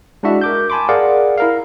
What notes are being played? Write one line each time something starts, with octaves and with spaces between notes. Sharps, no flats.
G#3 D4 E4 F#4 E5
A#4 D6 G6
G#5 A5 B5 C6 D6
G#4 A#4 D5 F5 F#5
E4 A#4 F5